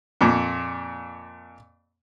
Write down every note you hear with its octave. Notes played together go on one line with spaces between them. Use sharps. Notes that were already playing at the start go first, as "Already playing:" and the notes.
F2 A#2